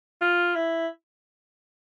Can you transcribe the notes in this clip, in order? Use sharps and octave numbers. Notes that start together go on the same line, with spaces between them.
F4
E4